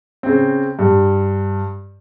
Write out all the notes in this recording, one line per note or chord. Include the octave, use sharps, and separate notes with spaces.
C#3 C4
G2